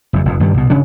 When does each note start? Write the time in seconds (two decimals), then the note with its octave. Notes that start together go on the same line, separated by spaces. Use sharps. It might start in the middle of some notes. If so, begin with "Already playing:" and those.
0.13 F#1 E2
0.25 F1 F2
0.40 G2 D#3 G3
0.54 C2 B2
0.70 G#1 C#3 C#4 D4